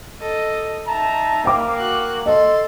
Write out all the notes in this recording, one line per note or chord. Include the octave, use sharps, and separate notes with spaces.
A4 D#5
D#4 E5 A5 A#5
A#3 G5 D6
F#4 F#6
A4 D#5 C6